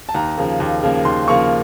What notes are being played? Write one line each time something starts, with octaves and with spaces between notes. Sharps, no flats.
A5
D#2 A#5
C#3 F3 A#3
D#2
C#3 F3 A#3
D#2 C6
C#3 F3 A#3 C#6